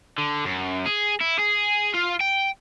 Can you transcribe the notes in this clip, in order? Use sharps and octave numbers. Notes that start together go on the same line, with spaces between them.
D3
F#2
G#4
E4
G#4
F4
G5